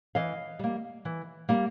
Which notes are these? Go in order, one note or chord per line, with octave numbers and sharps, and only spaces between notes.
E3 D#5 F5
G3 A#3
E3
G3 A#3